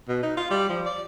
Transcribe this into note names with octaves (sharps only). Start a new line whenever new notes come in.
B2
D#4
F4
G3
F3
D5